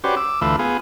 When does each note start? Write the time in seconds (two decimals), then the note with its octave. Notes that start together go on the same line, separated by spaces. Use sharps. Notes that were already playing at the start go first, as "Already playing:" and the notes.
0.04 C#4 F#4 G4 B4 C5 D5
0.17 D6 E6
0.41 D2 E3 A3 F4 B4 E6
0.59 B3 F4 G#4